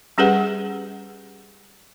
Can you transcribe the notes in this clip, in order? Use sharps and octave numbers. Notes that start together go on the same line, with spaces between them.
G3 C#4 G4 G#4 B4 F#5